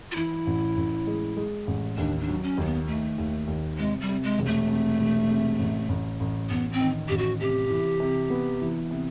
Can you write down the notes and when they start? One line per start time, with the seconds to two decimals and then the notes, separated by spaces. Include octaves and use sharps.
0.12 F4
0.16 E3 E4
0.47 A1
0.77 A1
1.07 G#3
1.37 G#3
1.67 A1
1.98 D#2 D4
2.20 D4
2.28 F#3
2.43 C#4
2.58 D#2 A#3
2.65 B3
2.88 D#3 A3
3.18 D#2
3.48 D#2
3.78 C3 G#3
4.01 G3
4.09 C3
4.24 G#3
4.39 E1
4.46 A3
4.68 C3
4.99 E1
5.29 C3
5.60 A1
5.89 A1
6.20 A1
6.50 A1 B3
6.72 C4
6.80 D#3
7.09 A1 G4
7.18 F#4
7.40 C3 G4
7.70 E3
8.00 C3
8.30 B3
8.61 E3
8.91 C3